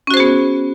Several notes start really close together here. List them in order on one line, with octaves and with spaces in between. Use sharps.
C#4 F#4 C5 G#4 B3